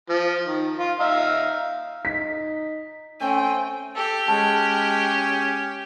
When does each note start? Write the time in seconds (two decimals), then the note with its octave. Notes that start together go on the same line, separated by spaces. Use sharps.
0.10 F3
0.45 D#3
0.79 F4
1.00 D#4 E5 F5
2.05 D#4 B6
3.20 A3 C4 C#4 G5 G#5
3.96 G4 A4
4.28 G#3 C#4 A5